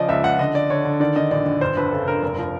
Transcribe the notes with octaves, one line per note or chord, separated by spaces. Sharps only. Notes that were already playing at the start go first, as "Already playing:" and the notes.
Already playing: C#3 F3 D5 D#5
C#2 E5
C#2 F#5
D3 D#5
D3 D5
D3 C#5
D3
D#3 D5
D#3 D#5
A#1 D5
A#1
G1 C5
F2 B4
C#3 A4
G1 A#4
F1
F3